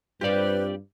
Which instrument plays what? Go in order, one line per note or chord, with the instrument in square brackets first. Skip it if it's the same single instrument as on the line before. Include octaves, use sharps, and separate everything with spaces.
[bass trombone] G2 [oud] G3 C4 F4 [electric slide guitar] G4 D5 [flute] B4